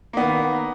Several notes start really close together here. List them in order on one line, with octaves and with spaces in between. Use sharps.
A#3 B3 D#3